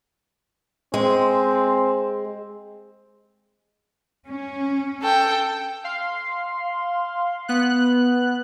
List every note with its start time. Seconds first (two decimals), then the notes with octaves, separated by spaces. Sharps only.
0.94 G#3 C4
4.29 C#4
5.02 A4 G5
5.84 F5 C6
7.48 B3 F#6